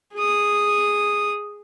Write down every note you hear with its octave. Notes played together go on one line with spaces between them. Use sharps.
G#4 D#6